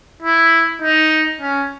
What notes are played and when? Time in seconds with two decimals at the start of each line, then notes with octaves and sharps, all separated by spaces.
0.22 E4
0.82 D#4
1.40 C#4